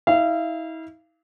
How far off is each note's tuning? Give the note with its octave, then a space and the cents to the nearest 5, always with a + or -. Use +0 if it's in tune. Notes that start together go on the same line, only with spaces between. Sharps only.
E4 -40 F5 -30